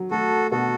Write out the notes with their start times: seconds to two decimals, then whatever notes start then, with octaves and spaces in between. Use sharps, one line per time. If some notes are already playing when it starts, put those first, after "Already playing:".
Already playing: F#3
0.11 A3 F#4 A4
0.51 B2 F#4 A4